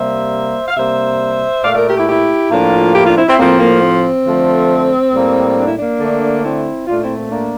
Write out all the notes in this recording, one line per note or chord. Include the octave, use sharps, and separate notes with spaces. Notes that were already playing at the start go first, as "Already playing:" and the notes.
Already playing: C3 G3 A#3 C5 E5
F5
C3 G3 A#3 C5 E5
A#2 A3 D5 F5
A#4 D5
G4 A#4
E4 G4
E4 G4
A2 F3 A#3 D4 F4
E4 G4
D4 F4
C4 E4
C4 E4
A2 F3 A#3 C4
A#3
C4
D3 F3 A3
A2 G3 A#3
D4
E4
A#3 D4
D3 A3
C4 E4
A#2 A3 D4 F4
C4 E4
C4
A#3 D4